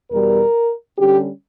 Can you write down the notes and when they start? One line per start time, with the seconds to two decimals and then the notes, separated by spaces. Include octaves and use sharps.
0.11 E2 B2 G3 A#4
0.98 D3 G3 C#4 G4